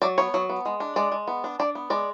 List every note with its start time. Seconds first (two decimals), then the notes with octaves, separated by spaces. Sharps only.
0.02 F#3 D5
0.18 B3 C#5
0.34 F#3
0.49 B3
0.66 G#3
0.80 D4
0.96 G#3 D5
1.12 G#3
1.28 B3
1.44 D4
1.60 D4 D5
1.75 B3
1.90 G#3 D5